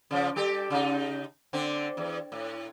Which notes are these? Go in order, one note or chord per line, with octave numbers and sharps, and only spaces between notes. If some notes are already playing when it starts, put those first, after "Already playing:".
C#3 F3
G3 G4 A4
C#3 D#4
D3 C4 D4
E2
A2